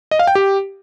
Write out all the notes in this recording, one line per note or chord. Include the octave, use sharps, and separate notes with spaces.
D#5
F5
G5
G4